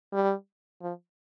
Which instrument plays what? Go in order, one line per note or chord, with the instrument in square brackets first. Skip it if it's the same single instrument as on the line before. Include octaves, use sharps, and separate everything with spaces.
[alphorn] G3
F3